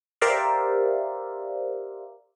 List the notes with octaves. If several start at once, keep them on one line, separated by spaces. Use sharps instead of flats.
G4 A#4 C5 D5 E5 F5